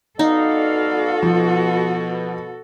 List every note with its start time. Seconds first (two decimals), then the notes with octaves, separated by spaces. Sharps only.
0.19 B3 D#4 F#4 A4 D5 F5
1.23 B2 F3